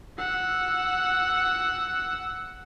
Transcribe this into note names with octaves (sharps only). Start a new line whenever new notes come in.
F#5 E6